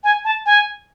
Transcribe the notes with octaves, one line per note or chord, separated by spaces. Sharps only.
G#5
A5
G#5